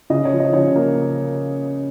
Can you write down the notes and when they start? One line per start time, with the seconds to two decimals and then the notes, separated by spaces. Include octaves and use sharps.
0.10 C#3 D#5
0.25 C#5
0.33 F3
0.40 D#5
0.53 C#3 C#5
0.76 A#3